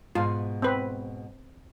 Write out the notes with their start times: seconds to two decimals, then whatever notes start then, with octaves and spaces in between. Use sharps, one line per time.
0.15 G#2 B2 F4 G#5
0.62 C4 B4